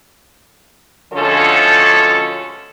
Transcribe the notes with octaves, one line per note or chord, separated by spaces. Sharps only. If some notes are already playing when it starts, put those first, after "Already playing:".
D2 D3 F3 G#3 C#4 A4